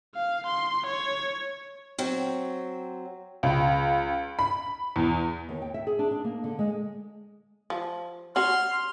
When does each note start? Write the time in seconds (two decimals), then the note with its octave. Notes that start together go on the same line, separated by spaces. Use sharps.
0.15 F5
0.47 C6
0.87 C#5
1.98 F#3 C4
3.43 C#2
4.39 B5
4.96 E2
5.49 D#2
5.62 G5
5.74 E5
5.87 G#4
5.99 D4
6.11 D4
6.25 A#3
6.44 D3
6.59 G#3
7.70 F3
8.36 C#4 F#4 F#5 C6 F6